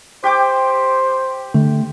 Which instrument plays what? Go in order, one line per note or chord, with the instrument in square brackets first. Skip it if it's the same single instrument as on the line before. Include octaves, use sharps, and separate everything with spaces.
[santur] G4 G5 D6 [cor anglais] C5
[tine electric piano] D3 [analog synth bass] A3